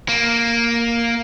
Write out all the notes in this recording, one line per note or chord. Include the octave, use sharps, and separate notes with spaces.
A#3